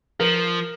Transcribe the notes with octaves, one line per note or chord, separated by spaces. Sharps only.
F3 A#4